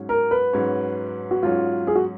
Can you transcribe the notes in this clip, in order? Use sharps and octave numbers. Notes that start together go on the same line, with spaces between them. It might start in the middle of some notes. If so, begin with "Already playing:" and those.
Already playing: G#2 F#3 C#4
A#4
B4
G#2 F#3 C#4
F#4
G#2 F#3 C#4 F4
G#4
F#4